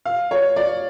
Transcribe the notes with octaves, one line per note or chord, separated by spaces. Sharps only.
F5
C#5
D5